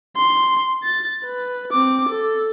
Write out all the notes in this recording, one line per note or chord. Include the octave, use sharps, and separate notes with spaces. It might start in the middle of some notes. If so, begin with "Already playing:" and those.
C6
A6
B4
C4 D6
A4